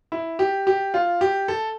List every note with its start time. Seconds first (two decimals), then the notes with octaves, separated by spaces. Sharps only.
0.12 E4
0.39 G4
0.67 G4
0.94 F4
1.21 G4
1.48 A4